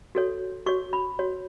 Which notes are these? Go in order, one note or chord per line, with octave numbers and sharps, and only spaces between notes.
F#4 A4 C#5
F#4 C#5 C#6
B5
F#4 C#5